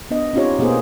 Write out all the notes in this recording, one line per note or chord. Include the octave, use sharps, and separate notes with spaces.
B3 D4 D#5
C4 C#4 D#4 F4 G4 C#5
B2 A#3 B3 G#4 C5